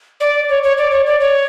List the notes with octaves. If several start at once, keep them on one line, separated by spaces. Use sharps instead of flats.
D5
C#5
C#5
D5
C#5
D5
C#5